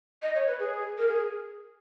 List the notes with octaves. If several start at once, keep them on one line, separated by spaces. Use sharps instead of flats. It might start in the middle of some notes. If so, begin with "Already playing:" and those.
D#5
C#5
B4
G#4
A#4
G#4